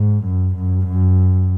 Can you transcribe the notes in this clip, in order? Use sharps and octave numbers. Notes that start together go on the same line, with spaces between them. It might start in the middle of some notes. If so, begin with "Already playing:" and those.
Already playing: G#2
F#2
F#2
F#2